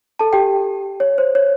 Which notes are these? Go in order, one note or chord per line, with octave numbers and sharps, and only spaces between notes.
A4 A5
G4 G5
C#5
C5
C#5